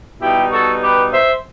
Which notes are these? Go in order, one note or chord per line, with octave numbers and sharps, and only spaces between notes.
B2 G3 D#4 E4 G4
F#4 A4
G4 B4
C5 E5